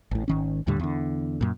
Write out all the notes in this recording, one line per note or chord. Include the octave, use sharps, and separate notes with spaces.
A1 A2
G#1 D#3 C#4
D#2 A2 D3 G3
E2 D3
F#2 A#2